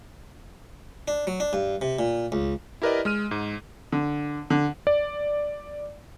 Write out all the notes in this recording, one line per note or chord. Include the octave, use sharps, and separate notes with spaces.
D4
F#3
D4
G2
C3
A#2
C#2
E4 G4 A#4 B4 D5 D#5
G#3 F6 D#7
G#2
D3
D3
D5